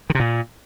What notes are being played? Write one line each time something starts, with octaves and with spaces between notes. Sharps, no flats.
D#3
C3
A#2